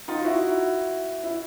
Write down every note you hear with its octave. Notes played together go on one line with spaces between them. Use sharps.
D#4 F4
E4 F#4
E4